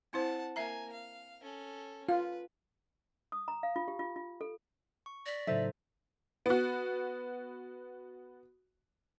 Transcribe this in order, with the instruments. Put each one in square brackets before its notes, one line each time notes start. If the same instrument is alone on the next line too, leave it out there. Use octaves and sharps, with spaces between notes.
[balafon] C4 E4 C5 [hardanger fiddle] F#5 A5
[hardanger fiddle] A#3 G#5 [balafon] E5 A#5
[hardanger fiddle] F5
C#4 A4
[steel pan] F4 [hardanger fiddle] B4 [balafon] F5
[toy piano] D#6
A#5
F5
F4
G4
F4
F4
A4
[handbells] C#6
[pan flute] D5 [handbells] A#6 B6
[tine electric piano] A2 C#3 F#3 [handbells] D#4 A4 C5 [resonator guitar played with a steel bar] E5
[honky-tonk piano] B3 F#4